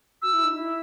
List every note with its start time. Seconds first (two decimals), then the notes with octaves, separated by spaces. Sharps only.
0.22 F#4 E6
0.33 E4
0.44 D#4
0.54 E4